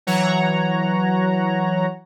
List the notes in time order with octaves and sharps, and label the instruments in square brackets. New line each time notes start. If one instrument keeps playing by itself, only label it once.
[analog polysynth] E3 F#3 C#5 F#5 A#5